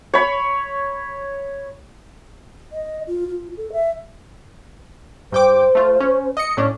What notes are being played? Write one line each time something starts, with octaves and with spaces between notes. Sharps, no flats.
C#5 B5
D#5
F4
F4
A4
E5
G2 C5 G5 D6
A3 F4
C#4
D#5 C#7
A2 C#4 D4